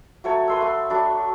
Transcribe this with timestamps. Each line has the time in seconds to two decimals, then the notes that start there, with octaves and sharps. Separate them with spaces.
0.24 F#3 A3 C#5
0.48 B4 C6 E6
0.60 A3 C6
0.90 F#3 D4 B5